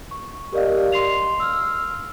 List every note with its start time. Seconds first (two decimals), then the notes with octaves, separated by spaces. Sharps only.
0.11 C#6
0.52 G4 A#4 D5 D#5 F5
0.92 C6 C7 F7
1.40 E6 F6